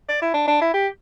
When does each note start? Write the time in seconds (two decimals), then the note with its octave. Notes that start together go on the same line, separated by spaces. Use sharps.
0.08 D5
0.22 E4
0.34 D4
0.47 D4
0.61 E4
0.73 G4